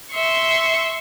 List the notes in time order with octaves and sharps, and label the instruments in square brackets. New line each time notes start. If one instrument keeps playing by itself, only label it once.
[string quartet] E5 C6 C#6